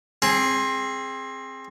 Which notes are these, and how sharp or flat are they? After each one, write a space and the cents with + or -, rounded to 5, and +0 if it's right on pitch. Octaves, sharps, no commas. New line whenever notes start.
C4 +20 G#4 +0